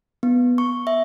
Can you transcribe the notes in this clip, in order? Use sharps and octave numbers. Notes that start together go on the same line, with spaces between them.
B3
C#6
E5